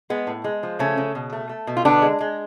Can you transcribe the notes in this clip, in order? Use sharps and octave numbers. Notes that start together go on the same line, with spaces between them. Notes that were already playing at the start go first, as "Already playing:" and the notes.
G#3 B3
A2
G#3
F3
C#3 A3 C#4
C#3
B2
A3
A3
B2
F4
D3 B3 D4
G#3
G#3